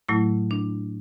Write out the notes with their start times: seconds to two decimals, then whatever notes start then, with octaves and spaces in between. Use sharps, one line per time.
0.09 A2 F#3 A3 E4
0.51 D4